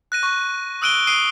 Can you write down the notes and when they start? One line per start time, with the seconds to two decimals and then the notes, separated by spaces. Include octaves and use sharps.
0.12 F#6 A#6 D#7
0.23 C#6
0.82 D#6 E6 F#6 D7 D#7 G7
1.07 D#6 C7 D7 D#7 G7